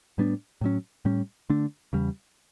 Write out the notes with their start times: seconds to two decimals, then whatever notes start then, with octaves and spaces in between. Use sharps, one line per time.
0.18 A2 G3 B3 D4
0.61 A2 F#3 C#4
1.05 A2 G3 C#4
1.50 D3 A3 D4
1.93 E2 C#3 G3